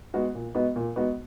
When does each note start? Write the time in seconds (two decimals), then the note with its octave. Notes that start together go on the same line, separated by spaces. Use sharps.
0.14 G#3 B3 D#4 F#4
0.35 A#2
0.55 G#3 B3 D#4 F#4
0.76 A#2
0.96 G#3 B3 D#4 F#4